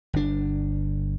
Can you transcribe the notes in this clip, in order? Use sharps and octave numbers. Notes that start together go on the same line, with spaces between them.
G1 D4